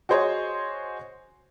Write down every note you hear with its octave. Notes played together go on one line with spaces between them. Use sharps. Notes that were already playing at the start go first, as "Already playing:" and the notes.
F#4 G#4 C5 C#5 D#5